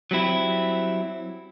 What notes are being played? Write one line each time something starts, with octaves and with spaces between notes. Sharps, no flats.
F#3 G3 C4 E4